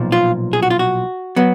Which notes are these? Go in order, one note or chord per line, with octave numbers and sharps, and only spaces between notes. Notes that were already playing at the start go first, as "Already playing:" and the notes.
Already playing: B1 A#2 F3
F4
G#4
F#4
F4
F#4
F#3 B3